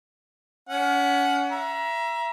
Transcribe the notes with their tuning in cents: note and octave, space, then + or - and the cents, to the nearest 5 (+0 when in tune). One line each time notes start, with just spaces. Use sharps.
C#4 +30 F#5 +0
E5 +25 A#5 +30